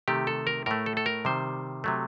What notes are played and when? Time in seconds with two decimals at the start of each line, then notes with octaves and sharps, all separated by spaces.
0.08 C3 D#3 A3 G4
0.27 A4
0.47 A#4
0.66 A2 A3 A#4
0.86 A4
0.97 A4
1.06 A#4
1.25 C3 D#3 G3 C5
1.84 C3 F#3 A3